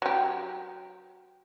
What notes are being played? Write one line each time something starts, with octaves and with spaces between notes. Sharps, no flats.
F#3 G4